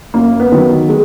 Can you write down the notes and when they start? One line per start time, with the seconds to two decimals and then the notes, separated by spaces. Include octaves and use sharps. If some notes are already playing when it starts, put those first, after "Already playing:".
0.14 F#2 A#3
0.40 B3
0.52 D#3 F#3
0.89 G#3